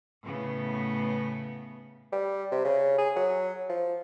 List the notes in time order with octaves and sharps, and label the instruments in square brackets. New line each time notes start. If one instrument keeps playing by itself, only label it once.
[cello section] A2 C#3 B3
[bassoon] G3
C3
C#3
G#4
F#3
F3